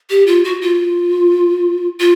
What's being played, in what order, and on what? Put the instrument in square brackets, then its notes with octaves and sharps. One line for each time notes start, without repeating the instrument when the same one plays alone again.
[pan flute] G4
F4
F#4
F4
F4